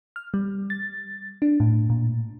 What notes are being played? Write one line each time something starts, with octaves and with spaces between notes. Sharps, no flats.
F6
G3
A6
D4
A2
A#2